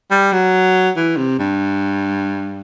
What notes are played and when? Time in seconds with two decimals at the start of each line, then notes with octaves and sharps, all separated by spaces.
0.11 G3
0.32 F#3
0.97 E3
1.17 C3
1.39 G2